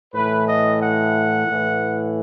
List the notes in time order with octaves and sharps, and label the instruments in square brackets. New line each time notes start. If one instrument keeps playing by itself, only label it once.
[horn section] A2 E3 B4
D#5
F#5
A2 E3